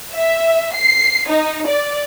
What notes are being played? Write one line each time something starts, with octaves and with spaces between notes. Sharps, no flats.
E5
C7
D#4
D5